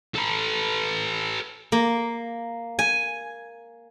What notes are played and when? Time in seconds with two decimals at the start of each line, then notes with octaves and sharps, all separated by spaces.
0.15 A4 B4
1.72 A#3
2.79 G#5